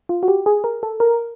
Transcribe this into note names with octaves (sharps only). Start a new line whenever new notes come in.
F4
F#4
G4
G#4
A#4
A4
A#4